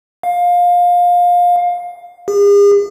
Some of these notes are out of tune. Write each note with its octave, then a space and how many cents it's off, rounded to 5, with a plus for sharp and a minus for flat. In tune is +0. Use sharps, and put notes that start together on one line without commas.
F5 +20
G#4 -45